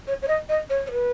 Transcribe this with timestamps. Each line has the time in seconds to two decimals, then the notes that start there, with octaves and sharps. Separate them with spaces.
0.07 C#5
0.22 C#5
0.27 D#5
0.49 D#5
0.69 C#5
0.86 C#5
0.91 B4